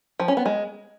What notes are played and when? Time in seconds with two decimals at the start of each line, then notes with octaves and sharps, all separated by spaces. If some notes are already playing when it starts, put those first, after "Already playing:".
0.20 F3
0.28 C#4
0.37 B3
0.46 G#3